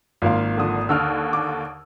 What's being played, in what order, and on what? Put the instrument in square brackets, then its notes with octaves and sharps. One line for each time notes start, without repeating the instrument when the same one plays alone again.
[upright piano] G#1 A#3 C6 [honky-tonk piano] F4 F5
[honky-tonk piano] D3 F3 D#6
[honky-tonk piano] D#2 D3 [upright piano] E6 F6
[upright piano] D6